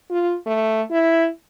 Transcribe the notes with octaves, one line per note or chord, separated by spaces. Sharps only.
F4
A3
E4